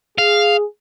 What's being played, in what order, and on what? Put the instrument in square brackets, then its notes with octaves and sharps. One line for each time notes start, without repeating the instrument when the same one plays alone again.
[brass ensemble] G#4 [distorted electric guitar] F5